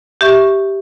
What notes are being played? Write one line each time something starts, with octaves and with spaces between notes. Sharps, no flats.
G4 E5 C#6